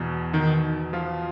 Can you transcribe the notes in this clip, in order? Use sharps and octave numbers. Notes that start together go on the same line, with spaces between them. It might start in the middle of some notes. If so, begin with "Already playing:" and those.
Already playing: E2 B2
D#3 D#4
F3 F4